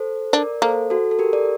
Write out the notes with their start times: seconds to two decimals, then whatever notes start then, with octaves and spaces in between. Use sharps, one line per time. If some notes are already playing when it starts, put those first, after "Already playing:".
Already playing: A4 C5
0.33 D4 A#4 D5
0.62 A#3 A4 C5
0.90 F#4 A4
1.11 A4
1.19 G4 A#4
1.33 A#4 D5